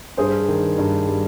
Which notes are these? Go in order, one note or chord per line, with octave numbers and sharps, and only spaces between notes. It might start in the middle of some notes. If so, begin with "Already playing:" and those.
G2 G#4 C5
D#3
G2
G3